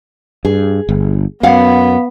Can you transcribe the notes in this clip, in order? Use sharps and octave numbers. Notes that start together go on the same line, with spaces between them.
G2 G#4
G1
F#2 B3 F5 F#5